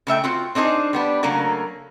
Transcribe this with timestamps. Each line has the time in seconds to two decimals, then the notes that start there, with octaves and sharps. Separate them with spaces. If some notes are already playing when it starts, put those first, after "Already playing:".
0.07 C#3 A3 E5 G5
0.24 C4 F4 F#4
0.55 C4 D4 D#4 G#4 C5
0.93 G3 B3 D4
1.23 C#3 F#3 A3 A#3